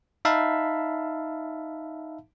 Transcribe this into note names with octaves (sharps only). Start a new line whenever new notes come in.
D#4 E5 F5 A5 B5